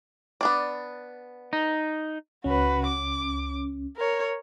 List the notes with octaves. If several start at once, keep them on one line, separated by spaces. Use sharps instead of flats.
B3 D4 D5
D#4
C#2 C#4 F#4 B4
D6
A#4 C#5